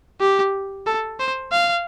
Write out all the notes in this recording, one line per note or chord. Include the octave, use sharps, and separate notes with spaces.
G4
A4
C5
F5